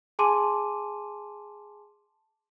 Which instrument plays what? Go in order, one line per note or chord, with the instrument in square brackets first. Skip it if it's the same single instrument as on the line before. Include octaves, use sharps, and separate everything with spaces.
[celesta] G#4 G#5 A5 C6 D6 D#7